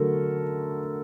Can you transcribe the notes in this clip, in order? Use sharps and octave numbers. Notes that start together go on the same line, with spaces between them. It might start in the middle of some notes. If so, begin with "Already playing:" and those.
Already playing: D3 F#3 A3 A4 A#4